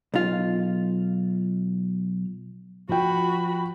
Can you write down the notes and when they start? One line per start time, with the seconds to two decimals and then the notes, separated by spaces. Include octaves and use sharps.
0.14 B1 F4
2.89 F3 F#4 G5 B5